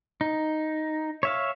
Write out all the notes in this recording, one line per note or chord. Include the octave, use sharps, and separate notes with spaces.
D#4
C#5 E5 F5